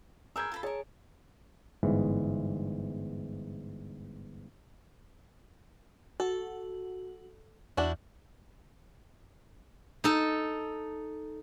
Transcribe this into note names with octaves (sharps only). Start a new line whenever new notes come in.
G#4 A#4 B4 E6 G6 G#6
F4 A4 B5
G#4 A#4 C#5 A5
G1 G#2 E3
F#4 A4
E2 D4 E4 F#4
D#4 A4